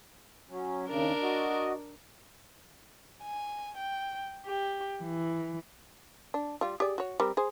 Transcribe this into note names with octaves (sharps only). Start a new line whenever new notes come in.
F#3 C#4
D#2 C#3 D4 A#4
F#4 D#5
G#5
G5
G4
E3
D4
G3 F4
G4 G#4 D5
F#4 C#5
G3 C4 A#4
G#4 C5